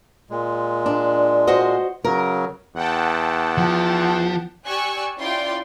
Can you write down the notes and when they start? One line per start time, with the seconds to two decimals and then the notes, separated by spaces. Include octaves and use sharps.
0.30 A#2 G#3
0.86 D4
1.47 F#4 C5 D#5
2.05 C#3 F#3 A#4
2.75 E2 F#5 G5 A5
3.58 F3
4.66 G4 D5 G#5 C#6 E6 F#6
5.18 C#4 E4 F4 D5 G5 C6